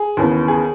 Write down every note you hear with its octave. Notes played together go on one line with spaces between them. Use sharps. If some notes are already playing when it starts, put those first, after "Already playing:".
Already playing: G#4
D#2 C#3 E3 B3
G#4